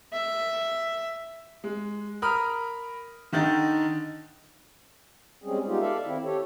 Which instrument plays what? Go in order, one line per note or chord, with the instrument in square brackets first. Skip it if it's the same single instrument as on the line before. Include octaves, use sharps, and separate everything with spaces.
[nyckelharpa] E5
[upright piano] G#3
A#4 B5 D#6 F6
D3 D#3 D#4 A6
[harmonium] G3 G#3 C4 C#4 G#4
G#3 B3 D#4 F4 G4
A4 D5 E5 F5
D#3 C4 E4
G4 A4 C#5